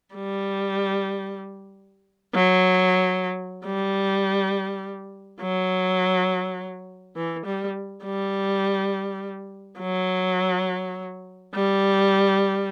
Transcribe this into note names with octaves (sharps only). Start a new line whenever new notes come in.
G3
F#3
G3
F#3
E3
G3
G3
F#3
G3